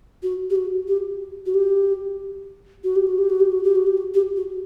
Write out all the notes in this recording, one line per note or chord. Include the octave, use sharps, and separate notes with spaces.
F#4
G4
F#4
G4
F#4
G4
F#4
G4
F#4
G4
F#4
G4
F#4
G4
F#4
G4
F#4
G4
F#4